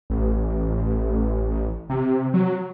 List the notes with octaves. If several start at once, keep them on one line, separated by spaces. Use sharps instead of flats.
A1
C3
F#3